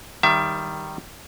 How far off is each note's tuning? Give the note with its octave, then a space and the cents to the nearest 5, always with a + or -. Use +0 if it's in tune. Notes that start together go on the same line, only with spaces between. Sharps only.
D#3 -5 G3 +0 E5 +30